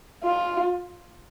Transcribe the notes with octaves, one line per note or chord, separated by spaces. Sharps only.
F4